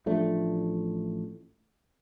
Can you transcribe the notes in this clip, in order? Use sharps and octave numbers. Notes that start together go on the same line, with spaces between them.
A1 F3 A3 D4